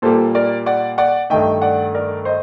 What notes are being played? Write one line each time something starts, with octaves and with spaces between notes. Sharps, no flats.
A#2 G3 A#3 A4 C5
A#4 D5
D5 F#5
D5 F#5
G2 D#3 A3 D#5 G5
D5 F#5
A#4 D5
C5 D#5